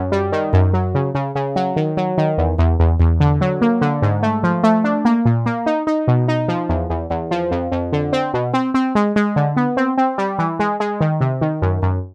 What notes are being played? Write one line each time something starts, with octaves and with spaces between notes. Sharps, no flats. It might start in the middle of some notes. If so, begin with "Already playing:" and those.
Already playing: F#2
G3
D#3
F#2
F#3
C#3
C#3
C#3
F#3
D#3
F#3
D#3
E2
E2
E2
E2
D3
F#3
A#3
D3
G#2
A3
F3
A3
D4
A#3
A#2
A#3
D#4
D#4
B2
D#4
F3
E2
E2
E2
F3
F2
F2
D3
C4
B2
C4
C4
G#3
G#3
D3
B3
C4
C4
G3
E3
G#3
G#3
D#3
C3
D#3
F#2
F#2